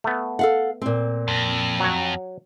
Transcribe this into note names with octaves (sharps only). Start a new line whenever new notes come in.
A3 B3
A4 F5 F#5
A#2 C4
F2
F#3 C#5